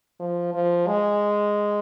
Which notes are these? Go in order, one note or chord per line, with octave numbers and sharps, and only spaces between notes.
F3
F3
G#3